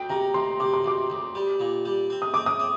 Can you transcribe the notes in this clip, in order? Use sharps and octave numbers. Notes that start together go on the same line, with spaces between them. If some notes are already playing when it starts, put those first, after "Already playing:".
Already playing: D2 G5
C3 A#5
D2 C6
C3 D6
C6
D2 D6
D2
G3
A#2
G3
C4
D#6
C4 D6
D#6
C4